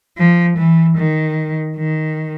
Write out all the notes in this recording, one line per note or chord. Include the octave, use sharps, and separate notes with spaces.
F3
E3
D#3
D#3